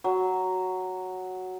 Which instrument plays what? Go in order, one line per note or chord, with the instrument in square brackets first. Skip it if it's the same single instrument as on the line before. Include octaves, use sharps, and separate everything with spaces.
[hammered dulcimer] F#3